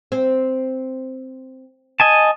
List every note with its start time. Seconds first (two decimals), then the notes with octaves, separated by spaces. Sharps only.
0.12 C4
2.00 D#5 G#5 A5